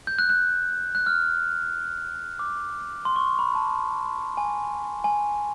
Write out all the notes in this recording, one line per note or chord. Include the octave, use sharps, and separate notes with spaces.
G6
F#6
F#6
F#6
F6
D6
C6
C#6
C6
B5
A5
G#5
G#5